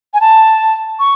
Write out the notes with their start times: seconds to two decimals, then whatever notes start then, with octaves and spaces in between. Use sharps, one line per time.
0.14 G#5
0.21 A5
0.99 C#6